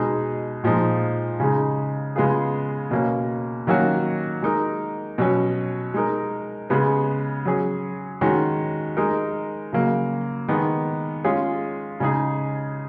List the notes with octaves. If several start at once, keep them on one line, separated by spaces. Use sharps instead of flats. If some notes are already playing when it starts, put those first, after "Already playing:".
Already playing: B2 G#3 D#4 G#4
A#2 F3 G#3 D#4
C#3 G#3 D#4
C#3 G#3 B3 F4 G#4
B2 A#3 C#4
D#3 F#3 A#3 C#4 F#4
G#3 D#4 A#4
B2 F#3 C#4
G#3 D#4 A#4
C#3 G#3 B3
F#3 C#4 G#4
D#3 G#3 C#4 F#4
G#3 D#4 A#4
C#3 F#3 A#3
D#3 G#3 B3
G#3 C#4 F4 G#4
C#3 G#3 D#4 G#4